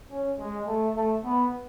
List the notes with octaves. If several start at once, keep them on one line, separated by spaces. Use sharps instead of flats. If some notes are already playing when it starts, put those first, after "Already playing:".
C#4
G#3
A3
A3
B3